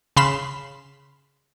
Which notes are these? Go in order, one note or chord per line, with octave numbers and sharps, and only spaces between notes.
C#3 F5 B5 C6 E7